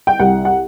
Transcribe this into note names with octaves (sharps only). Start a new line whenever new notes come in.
G5
C2 F#5
F#5